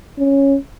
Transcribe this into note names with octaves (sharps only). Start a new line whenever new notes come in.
C#4